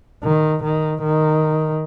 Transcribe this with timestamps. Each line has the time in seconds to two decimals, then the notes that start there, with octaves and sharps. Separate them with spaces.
0.24 D#3
0.63 D#3
1.02 D#3